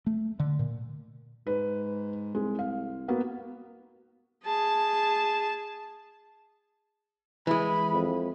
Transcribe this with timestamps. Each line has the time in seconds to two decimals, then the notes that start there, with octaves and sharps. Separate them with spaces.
0.06 A3
0.40 D3
0.59 A#2
1.47 G#2 B4
2.35 C2 G#3
2.59 F5
3.08 G#2 A#3 B3 F#4
4.45 G#4 A5
7.47 E3 G#3 B5
7.91 F2